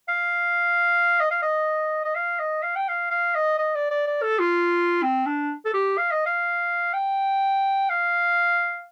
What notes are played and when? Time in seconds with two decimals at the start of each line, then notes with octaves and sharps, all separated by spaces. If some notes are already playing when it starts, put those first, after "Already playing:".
0.08 F5
1.20 D#5
1.31 F5
1.42 D#5
2.05 D#5
2.15 F5
2.39 D#5
2.63 F5
2.76 G5
2.88 F5
3.11 F5
3.35 D#5
3.59 D#5
3.75 D5
3.91 D5
4.07 D5
4.22 A4
4.39 F4
5.03 C4
5.26 D4
5.65 A4
5.74 G4
5.98 F5
6.11 D#5
6.26 F5
6.93 G5
7.89 F5